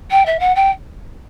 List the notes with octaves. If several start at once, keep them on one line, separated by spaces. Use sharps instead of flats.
G5
E5
F#5
G5